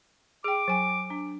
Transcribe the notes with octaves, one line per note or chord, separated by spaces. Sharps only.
G#4 G5 D6
F#3 G#5
D4